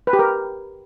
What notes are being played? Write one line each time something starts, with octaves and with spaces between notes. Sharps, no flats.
B4
G4
A#4